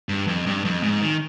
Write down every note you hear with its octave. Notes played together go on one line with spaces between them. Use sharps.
G2
F2
G2
F2
G#2
D#3